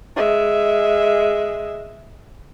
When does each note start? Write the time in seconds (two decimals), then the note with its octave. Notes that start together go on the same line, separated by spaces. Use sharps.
0.16 G#3 E5